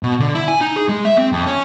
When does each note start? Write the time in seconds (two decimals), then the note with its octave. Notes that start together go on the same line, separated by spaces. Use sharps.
0.03 B2
0.20 D3
0.35 E4
0.48 G#5
0.61 D#4
0.76 G#4
0.89 G#3
1.05 E5
1.18 C4
1.32 F2
1.46 C#4